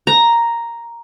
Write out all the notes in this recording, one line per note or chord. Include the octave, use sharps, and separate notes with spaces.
A#5